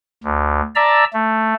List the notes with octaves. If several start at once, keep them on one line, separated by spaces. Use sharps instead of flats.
D2
D5 E5 A5 A#5 E6
A3